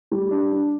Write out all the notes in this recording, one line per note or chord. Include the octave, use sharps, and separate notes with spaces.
G3
D4
D4